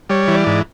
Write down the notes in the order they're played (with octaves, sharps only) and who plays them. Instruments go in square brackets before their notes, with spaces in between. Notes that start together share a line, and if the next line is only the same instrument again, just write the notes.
[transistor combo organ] G3 C#5
E3
D5
G#2